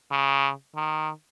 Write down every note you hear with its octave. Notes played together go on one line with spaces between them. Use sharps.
C#3
D#3